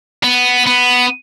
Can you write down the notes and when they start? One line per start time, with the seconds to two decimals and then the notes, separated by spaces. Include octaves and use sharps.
0.23 B3
0.66 B3